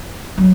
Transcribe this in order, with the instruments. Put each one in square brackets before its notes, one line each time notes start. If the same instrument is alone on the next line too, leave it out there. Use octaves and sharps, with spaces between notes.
[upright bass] F#3